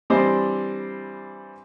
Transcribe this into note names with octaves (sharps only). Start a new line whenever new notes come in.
E3 G3 C4 D4 C5 D#5